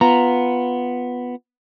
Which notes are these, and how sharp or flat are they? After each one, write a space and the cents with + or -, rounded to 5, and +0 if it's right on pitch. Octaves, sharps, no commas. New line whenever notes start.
B3 +0 F4 +0 A#5 +0